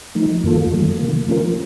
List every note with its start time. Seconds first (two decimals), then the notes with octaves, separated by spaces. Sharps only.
0.15 F3 A3 D#4
0.44 F#2 D#3 A#3 F4 A4
0.72 D#3 F#3 A3
0.99 C3 D#3 A#3
1.28 F3 A3 C#4 F4 A#4